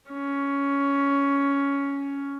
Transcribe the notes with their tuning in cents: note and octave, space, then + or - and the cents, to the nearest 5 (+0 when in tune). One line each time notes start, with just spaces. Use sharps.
C#4 +10